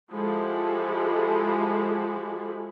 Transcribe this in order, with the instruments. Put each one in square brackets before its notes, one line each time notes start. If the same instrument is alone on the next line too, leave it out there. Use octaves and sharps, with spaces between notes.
[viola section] F3 G#3 E4 F#4 G4 A4